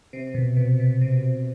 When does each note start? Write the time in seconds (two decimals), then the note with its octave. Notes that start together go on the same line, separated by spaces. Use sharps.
0.13 C3
0.35 B2
0.57 B2
0.80 B2
1.01 C3